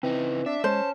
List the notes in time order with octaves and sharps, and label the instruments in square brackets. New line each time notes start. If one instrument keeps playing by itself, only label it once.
[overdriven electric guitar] C#3 D#4 [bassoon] E3 [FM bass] C4
[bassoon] D4 [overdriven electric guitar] E5
[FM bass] G#3 [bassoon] C#4 [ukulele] C5 [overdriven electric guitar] A5